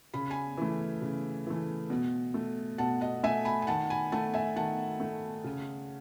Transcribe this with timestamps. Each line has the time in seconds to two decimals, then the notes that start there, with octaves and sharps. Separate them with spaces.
0.14 C#3 B5
0.30 G#5 B5
0.58 E3 A3
1.02 C#3
1.47 E3 A3
1.90 B2
2.34 A3
2.78 B2 F#5 A5
3.01 D#5 F#5
3.23 A3 E5 G#5
3.45 G#5 B5
3.62 G#5
3.67 D#3 F#5 A5
3.90 G#5 B5
4.12 A3 F#5 A5
4.34 E5 G#5
4.56 D#3 F#5 A5
5.00 A3
5.44 C#3